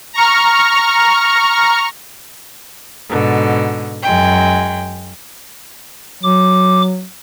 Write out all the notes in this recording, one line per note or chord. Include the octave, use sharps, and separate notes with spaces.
A#5 C#6 F6
G#2 B2 D3
F#2 G#3 G5
F#3 D6